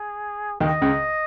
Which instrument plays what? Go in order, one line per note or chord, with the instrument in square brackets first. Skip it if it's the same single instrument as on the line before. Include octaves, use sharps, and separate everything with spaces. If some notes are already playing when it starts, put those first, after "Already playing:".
Already playing: [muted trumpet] G#4
[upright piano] D#2 D#3 [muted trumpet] D#5
[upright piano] C#2 C#3